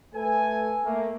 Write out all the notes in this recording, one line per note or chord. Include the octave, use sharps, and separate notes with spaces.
A3 A4 B4 G#5
A3 A#3